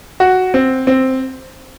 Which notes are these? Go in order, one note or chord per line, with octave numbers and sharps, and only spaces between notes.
F#4
C4
C4